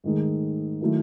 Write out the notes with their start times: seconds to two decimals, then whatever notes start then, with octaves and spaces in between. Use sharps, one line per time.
0.04 G#2 D#3 A3 D#4 G#4
0.81 D#3 F#3 A3 E4